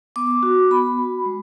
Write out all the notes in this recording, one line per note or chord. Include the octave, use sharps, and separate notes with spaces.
B3 D6
F#4
B3 B5
F#4
G#3